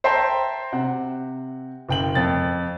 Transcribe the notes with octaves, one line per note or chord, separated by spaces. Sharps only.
C5 E5 G5 A5 A#5 C6
C3 F#5
F#1 G5 F#7
F2 A6